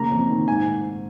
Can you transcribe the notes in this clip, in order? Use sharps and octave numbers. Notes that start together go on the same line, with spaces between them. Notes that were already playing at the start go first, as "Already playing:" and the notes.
Already playing: C#3 A#3 A#5
F2
D#3
G#2 G#5
G#2